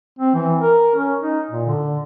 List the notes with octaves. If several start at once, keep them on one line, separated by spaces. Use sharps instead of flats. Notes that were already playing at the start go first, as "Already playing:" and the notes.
C4
E3
A#4
C#4
D#4
A#2
D3